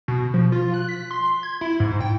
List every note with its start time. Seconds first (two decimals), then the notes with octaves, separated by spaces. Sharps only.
0.08 B2
0.34 F3
0.52 F4
0.74 F#6
0.88 B6
1.11 C6
1.43 G#6
1.61 E4
1.80 G#2
2.01 G5